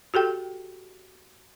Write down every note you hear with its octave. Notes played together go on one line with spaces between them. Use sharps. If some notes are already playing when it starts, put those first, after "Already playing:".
F#4 G4 A4 G5